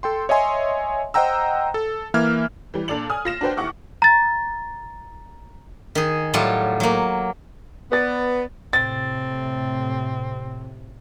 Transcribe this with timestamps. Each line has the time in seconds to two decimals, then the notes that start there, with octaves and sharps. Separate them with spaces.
0.03 A4 G5 C6
0.29 C#5 D#5 E5 G#5 C6
1.14 C5 D#5 F#5 G5 A#5 E6
1.74 A4
2.14 E3 A#3 E5 F6 G#6
2.74 E3 G3
2.88 A#2 D4 A4 D5 F7 F#7
3.10 G#5 D#6 F6
3.25 F4 A#6 E7
3.41 D4 F#4 B4 C5 G5
3.57 D#2 E4 F#5 C#6 D6 F6
4.02 A#5 A6
5.95 D#3 G#4
6.34 A2 F#3 G3 F4 F#5
6.80 F#3 A#3
7.92 B3 B4 D5 A6
8.73 A2 C3 C4 A6